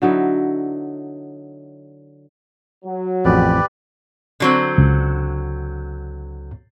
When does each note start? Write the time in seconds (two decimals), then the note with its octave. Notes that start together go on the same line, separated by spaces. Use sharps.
0.02 D3 F#3 D#4 E4
2.84 F#3
3.25 A1 F2 G4 B4 D5
4.40 D3 F#3 C4
4.78 C#2